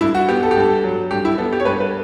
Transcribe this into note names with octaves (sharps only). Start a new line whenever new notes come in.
G2 E4
F#4
B3 G4
A4
G4
G2 A4
F#3
G2 G4
E4
B3 A4
G4
C#5
G2 B4
B4